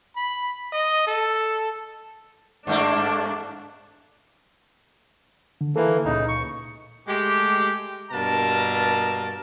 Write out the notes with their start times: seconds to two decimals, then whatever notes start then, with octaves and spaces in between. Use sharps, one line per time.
0.16 B5
0.73 D#5
1.07 A4
2.67 G2 A3 A#3 D4
5.61 D3
5.76 E3 A#3 A4 B4
6.05 C#2 A#2 C#3 D#4
6.28 C#6
7.08 G#3 A3 G4
8.12 G2 B2 A#3 A#4 A5